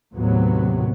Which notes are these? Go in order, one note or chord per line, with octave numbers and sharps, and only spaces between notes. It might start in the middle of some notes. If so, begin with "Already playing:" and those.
D#2 A2 C3 F#3 B3